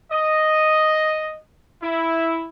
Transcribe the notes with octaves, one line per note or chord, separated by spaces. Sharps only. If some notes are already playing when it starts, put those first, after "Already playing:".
D#5
E4